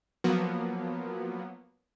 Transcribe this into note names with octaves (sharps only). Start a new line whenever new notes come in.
F3 F#3 A#3 B3